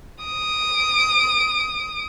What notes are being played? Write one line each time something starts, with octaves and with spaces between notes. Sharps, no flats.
D#6 D7